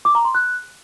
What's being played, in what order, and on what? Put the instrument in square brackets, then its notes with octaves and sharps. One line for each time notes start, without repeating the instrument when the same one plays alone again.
[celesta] D6
A#5
C6
F#6